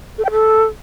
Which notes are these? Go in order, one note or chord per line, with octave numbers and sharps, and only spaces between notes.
A4
G5
A4